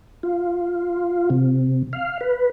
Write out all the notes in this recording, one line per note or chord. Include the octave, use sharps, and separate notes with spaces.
F4
C3
F5
B4